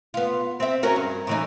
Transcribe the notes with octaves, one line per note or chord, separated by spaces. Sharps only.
B3 F4
C4 E5
C#4 F#4 A#4
G2
A2 E3 D#4